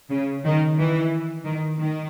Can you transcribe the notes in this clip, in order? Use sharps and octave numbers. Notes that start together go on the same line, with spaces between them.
C#3
D#3
E3
D#3
D#3